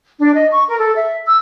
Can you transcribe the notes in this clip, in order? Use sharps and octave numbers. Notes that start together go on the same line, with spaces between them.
D4
D#5
C#6
A#4
A4
E5
E6